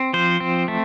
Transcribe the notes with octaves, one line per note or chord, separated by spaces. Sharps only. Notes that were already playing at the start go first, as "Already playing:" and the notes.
Already playing: C4
F3 C5
C4
A3